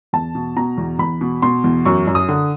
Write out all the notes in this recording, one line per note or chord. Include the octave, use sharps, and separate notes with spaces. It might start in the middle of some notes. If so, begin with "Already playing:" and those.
E2 A5
B2
B2 A#5
E2
E2 B5
B2
B2 C6
E2
F#2 C#6
F#2
D#6
D3